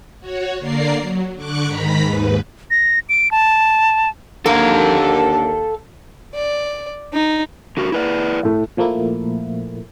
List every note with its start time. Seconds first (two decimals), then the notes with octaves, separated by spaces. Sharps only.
0.20 F#4 C#5
0.59 D3 A#3 A#4 D5 C7
1.00 F#3
1.35 D3 C#6 D6 F#6 C#7
1.66 G#2 D#3 A#5 B5 B6
2.02 D#2 G#2 B4
2.71 A#6
3.09 D7
3.31 A5
4.46 D#2 D3 A#3 A4 F5
6.34 D5
7.13 D#4
7.77 D3 F#4 A#4
7.92 E4 B4 D5
8.43 A2 A3
8.77 A#2 F3 A3 A#3 E4